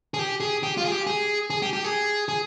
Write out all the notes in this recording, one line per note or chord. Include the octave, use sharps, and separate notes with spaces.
G#4
G4
G#4
G4
F4
G#4
G4
G#4
G#4
G4
G4
G#4
G#4